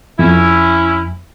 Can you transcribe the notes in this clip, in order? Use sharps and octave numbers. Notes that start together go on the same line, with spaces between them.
F2 C#4 E4